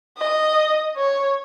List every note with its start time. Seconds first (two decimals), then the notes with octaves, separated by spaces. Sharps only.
0.18 D#5
0.97 C#5